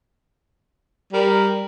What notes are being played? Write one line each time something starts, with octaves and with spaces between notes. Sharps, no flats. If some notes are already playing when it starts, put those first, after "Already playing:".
G3 A#4